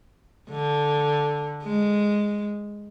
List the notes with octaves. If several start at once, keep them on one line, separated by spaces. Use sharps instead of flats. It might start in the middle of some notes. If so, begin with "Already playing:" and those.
D3
G#3